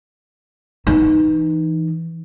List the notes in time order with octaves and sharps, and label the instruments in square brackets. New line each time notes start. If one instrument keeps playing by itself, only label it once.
[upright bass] E3 D#4